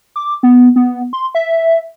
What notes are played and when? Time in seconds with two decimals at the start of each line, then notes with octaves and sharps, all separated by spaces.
0.16 D6
0.43 B3
0.76 B3
1.13 C6
1.35 E5